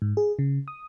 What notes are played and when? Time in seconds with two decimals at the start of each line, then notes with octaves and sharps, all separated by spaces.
0.02 G#2
0.17 G#4
0.39 C#3
0.68 D#6